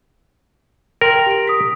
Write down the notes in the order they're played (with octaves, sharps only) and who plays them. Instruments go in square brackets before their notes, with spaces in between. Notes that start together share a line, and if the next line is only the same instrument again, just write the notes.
[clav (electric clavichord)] A#4 [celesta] G5 C6 F#7
[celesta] G4 D7
D#6 B6